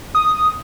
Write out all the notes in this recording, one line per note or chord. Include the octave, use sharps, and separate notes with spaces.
D#6